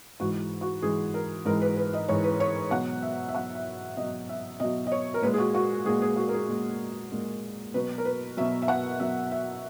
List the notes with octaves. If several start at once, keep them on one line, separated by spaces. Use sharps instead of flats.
G#2 E3 G#3 F#4
F#4
G#2 E3 G#3 G#4
A#4
G#2 E3 G#3 A#4
B4
B4
D#5
G#2 E3 G#3 C#5
B4
C#5
B2 F#3 F#5
E5
E5
B2 F#3 F#5
E5
B2 F#3 D#5
E5
B2 F#3 D#5
D#5
C#5
A#4
A#2 G#3 B4
G#4
F#4
F#4
A#2 G#3 G#4
G#4
F#4
A#4
G#4
A#2 G#3
A#2 G#3
B2 F#3 B4
A#4
B4
B2 F#3 E5
E5
F#5
B2 F#3 E5
E5